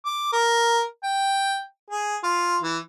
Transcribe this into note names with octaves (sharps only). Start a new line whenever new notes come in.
D6
A#4
G5
G#4
F4
E3